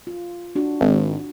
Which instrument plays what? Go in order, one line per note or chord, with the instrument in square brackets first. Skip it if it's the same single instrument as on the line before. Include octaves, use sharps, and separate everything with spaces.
[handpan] F4
D4 F#4
[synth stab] G#1